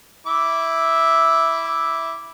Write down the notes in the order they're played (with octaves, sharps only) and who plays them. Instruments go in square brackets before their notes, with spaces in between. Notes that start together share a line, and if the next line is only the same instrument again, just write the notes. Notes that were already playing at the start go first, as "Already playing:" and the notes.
[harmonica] E4 E5 D6